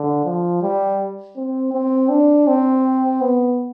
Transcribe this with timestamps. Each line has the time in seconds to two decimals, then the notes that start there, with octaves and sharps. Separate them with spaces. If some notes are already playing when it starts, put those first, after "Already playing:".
Already playing: D3
0.25 F3
0.62 G3
1.36 C4
1.73 C4
2.10 D4
2.47 C4
3.21 B3